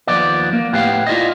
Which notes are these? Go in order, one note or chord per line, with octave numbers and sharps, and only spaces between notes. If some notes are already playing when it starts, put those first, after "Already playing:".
D#2 A#2 F3 B3 D5
A#3
A2 B3 G4 F5
E4 F4 D5 D#5